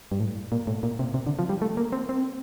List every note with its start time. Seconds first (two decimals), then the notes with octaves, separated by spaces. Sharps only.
0.12 G2
0.20 A2
0.52 A#2
0.67 A2
0.83 A#2
0.99 C3
1.14 C3
1.27 D3
1.39 F3
1.49 G3
1.62 A3
1.77 A#3
1.92 C4
2.09 C4